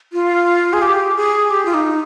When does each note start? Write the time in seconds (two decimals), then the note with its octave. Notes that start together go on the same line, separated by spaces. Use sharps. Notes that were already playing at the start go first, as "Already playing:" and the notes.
0.13 F4
0.73 G#4
0.82 G4
1.16 G#4
1.50 G4
1.65 F4
1.74 D#4